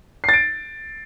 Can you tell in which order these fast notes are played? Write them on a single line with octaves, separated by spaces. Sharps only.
C7 A6 D7